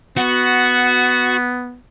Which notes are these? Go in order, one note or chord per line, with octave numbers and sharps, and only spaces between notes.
B3 F#4